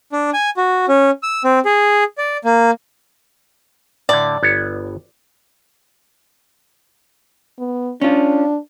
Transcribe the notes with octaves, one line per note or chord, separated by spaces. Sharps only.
D4
G#5
F#4
C#4
E6
C4
G#4
D5
A#3
A2 D3 D5
G1 B3 C#5
B3
C#4 D4 F4